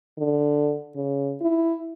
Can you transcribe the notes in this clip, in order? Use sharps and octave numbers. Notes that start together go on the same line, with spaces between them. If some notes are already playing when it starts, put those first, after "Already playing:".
D3
C#3
E4